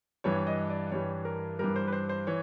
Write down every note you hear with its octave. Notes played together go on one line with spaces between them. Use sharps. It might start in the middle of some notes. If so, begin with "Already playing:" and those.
G2 E3 G3 C#5
D#5
D5
G2 E3 G3 C#5
A#4
G2 E3 G3 A#4
C5
B4
C5
C5
E3 C#5